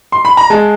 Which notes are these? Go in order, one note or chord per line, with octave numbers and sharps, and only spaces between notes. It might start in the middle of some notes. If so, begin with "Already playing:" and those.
C6
B5
A#5
G#3 A5